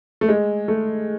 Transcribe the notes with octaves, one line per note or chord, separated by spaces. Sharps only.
A3
G#3
A3